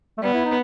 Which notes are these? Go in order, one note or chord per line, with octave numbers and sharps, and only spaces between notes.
A3
G3 B3
E4
D#4